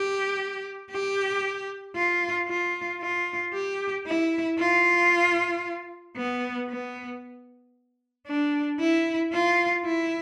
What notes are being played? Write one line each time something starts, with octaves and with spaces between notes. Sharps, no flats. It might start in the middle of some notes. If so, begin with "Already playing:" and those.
Already playing: G4
G4
F4
F4
F4
G4
E4
F4
B3
B3
D4
E4
F4
E4